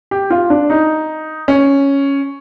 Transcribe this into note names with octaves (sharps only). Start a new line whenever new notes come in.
G4
F4
D4
D#4
C#4